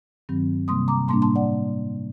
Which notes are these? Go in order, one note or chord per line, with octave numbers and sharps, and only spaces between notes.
G2 D#3 F#3 C4
C3 G3 A#3 C6 D#6
A#5 D6
A2 G3 A#3 D4 A5 C6
A5 C6
D5 F#5